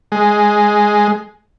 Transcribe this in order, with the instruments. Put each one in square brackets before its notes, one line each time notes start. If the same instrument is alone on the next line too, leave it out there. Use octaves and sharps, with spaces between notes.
[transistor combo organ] G#3